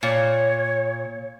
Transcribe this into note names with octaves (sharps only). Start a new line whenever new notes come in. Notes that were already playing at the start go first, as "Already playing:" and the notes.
A#2 C#5